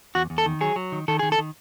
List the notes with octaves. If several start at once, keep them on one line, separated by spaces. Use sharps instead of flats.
E2 F#4
E2
A4
D#3
F#3 G#4
F#3
D#3
D#3 A4
D#3 G#4
A4
D#3